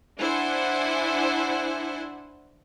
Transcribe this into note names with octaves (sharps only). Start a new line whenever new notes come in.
D4 E4 C5 F#5 G#5 C#7